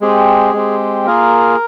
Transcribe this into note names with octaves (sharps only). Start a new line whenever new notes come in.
G#3 C4 G4 G#4
G#3 C4 G4
A#3 F4 G#4 A#4